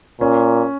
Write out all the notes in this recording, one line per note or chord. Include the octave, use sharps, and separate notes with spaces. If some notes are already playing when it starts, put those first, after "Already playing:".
A#2 C#4